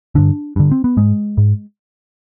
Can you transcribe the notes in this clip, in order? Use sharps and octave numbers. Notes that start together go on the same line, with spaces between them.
G2 D3 D4
G2 D3
C4
B3
G#2 G#3
G#2